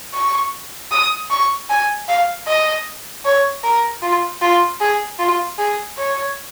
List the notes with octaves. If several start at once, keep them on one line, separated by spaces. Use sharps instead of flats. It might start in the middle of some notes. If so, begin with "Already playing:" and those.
C#6
D#6
C#6
G#5
F5
D#5
C#5
A#4
F4
F4
G#4
F4
G#4
C#5